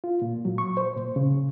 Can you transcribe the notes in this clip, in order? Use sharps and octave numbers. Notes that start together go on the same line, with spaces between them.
F4
A#2
F#3
C#6
C5
A#2
C#3